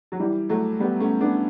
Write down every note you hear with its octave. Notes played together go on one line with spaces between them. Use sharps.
F#3
E3 G3
F#3 A3
G3 B3
A3 C#4
B3 D4